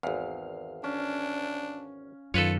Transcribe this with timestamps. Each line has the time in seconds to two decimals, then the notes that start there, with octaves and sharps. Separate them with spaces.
0.03 G#1 E2 F5
0.84 C#4 D4
2.34 F#2 D#3 F4 A4 B4 C#5 F5